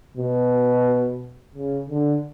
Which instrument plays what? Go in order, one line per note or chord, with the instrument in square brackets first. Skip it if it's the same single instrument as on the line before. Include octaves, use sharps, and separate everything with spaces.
[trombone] B2
C#3
D3